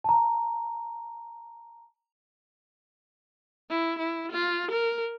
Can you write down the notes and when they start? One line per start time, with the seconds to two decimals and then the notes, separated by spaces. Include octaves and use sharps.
0.04 A5 A#5
3.70 E4
3.99 E4
4.32 F4
4.71 A#4